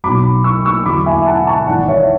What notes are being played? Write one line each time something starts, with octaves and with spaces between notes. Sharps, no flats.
B1 B2 F#3 B5 D6
C#6 E6
C#6 E6
E2 D3 F#3 B5 D6
E5 G#5
F#5 A5
A5 C#6
G#1 G#2 E3 D5 F#5
D5
C#5 E5